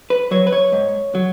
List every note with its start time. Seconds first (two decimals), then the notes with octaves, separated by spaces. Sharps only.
0.10 B4
0.31 F#3 C#5
0.47 B4
0.52 C#5
0.72 G#2
1.15 F#3